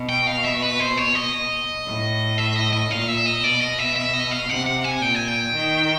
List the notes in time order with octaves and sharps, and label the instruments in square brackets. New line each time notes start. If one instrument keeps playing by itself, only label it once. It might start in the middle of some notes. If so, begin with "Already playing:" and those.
Already playing: [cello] B2
[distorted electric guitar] G5
F5
E5
B4
C5
C#5
D#5
[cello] A2
[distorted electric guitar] E5
D#5
D#5
[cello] A#2 [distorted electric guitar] F5
[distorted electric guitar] E5
D#5
[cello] B2 [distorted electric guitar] D5
[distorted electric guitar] D#5
E5
E5
D#5
F5
[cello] C3 [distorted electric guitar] F#5
[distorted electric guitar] F#5
G#5
[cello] A#2 [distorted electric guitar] G5
[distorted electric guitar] G#5
G5
[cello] D#3